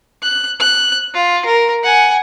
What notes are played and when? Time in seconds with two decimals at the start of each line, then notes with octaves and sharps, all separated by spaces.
0.23 F#6
0.60 F#6
1.14 F4
1.45 A#4
1.83 F#5 G#5